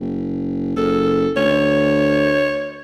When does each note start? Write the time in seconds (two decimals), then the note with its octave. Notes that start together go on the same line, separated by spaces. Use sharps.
0.01 F#1
0.77 F#1 A4
1.36 D2 C#5